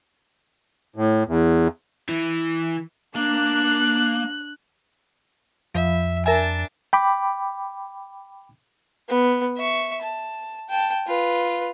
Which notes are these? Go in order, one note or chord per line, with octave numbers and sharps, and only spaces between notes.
A2
E2
E3
A#3 D4 F#6
F2 F3 E5
D4 A#4 E5 G#5 A5
G5 B5 D6
B3
E5 C#6
A5
G5 A5
F4 B4